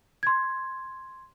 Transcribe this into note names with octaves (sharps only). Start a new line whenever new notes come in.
C6 G#6